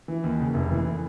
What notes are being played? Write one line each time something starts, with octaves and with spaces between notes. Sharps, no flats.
E3
D#2
C#3
F1
E3